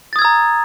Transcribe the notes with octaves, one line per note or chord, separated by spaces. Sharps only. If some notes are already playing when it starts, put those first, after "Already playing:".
A#5 D#6 E6 G#6 A6